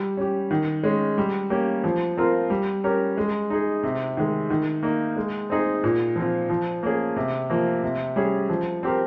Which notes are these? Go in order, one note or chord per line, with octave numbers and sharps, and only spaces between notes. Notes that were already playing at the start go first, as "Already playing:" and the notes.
Already playing: G3
C#4 G4
D#3
G#3 C#4
G3
A#3 C#4 G4
F3
C4 F4 A#4
G3
C#4 G4 A#4
G#3
D#4 G#4
C3
D#3 G#3
D#3
A#3 D#4
G#3
C4 D#4 G#4
A#2
F3 C4 F4
F3
A#3 C#4 G#4
C3
F3 A#3
C3
G3 C#4 G#4
F3
C4 G4 A#4